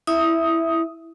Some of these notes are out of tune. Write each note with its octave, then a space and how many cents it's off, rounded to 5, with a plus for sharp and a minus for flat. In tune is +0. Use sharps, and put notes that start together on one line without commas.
E4 +0 E5 +0 D#6 +5